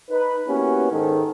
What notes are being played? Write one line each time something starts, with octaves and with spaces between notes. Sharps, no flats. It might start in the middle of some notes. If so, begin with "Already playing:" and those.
D#4 B4
A#3 B3 C#4 E4 F#4 G4
G#2 D#3 A4